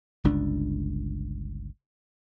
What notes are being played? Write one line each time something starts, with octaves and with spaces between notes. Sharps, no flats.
G1 C#2 D4